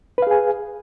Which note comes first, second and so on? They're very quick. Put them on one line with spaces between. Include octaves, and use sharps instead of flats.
B4 F5 G#4 G#5